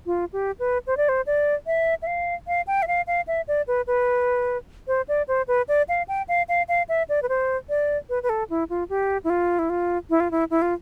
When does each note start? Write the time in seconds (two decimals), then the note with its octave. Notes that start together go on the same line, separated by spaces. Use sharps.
0.06 F4
0.33 G4
0.59 B4
0.87 C5
0.97 D5
1.09 C5
1.27 D5
1.67 E5
2.02 E5
2.07 F5
2.47 F5
2.67 G5
2.82 E5
2.88 F5
3.07 F5
3.27 E5
3.48 D5
3.68 B4
3.87 B4
4.88 C5
5.08 D5
5.28 C5
5.48 B4
5.68 D5
5.89 F5
6.08 G5
6.28 F5
6.49 F5
6.68 F5
6.89 E5
7.09 D5
7.22 B4
7.29 C5
7.69 D5
8.09 B4
8.23 B4
8.29 A4
8.50 E4
8.70 F4
8.90 G4
9.24 E4
9.30 F4
9.59 E4
9.70 F4
10.10 E4
10.20 F4
10.31 E4
10.51 E4
10.62 F4